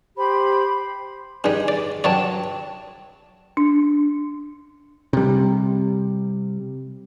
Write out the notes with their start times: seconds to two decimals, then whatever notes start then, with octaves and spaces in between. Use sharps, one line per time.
0.17 G4 C5 B5
1.44 G2 G3 D#4 G#4
1.68 D5
2.04 G2 F#3 C#5 D5 G5 A5
3.57 D4
5.13 C3 G3